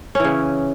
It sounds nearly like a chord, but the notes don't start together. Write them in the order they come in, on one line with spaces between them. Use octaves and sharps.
C#4 E3 C#3